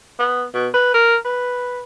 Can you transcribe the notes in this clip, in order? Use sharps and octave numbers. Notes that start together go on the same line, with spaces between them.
B3
B2
B4
A#4
B4